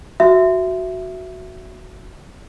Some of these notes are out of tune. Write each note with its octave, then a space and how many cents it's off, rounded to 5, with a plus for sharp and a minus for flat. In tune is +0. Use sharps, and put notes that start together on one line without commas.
F#4 +0 E5 +10